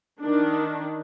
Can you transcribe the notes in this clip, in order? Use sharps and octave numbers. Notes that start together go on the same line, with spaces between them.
D#3 D4